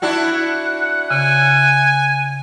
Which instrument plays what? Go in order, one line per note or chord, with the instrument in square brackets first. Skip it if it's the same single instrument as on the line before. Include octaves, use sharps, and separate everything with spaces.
[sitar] D4 E4 F#4 [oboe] F#5
[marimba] C#3 [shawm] G#5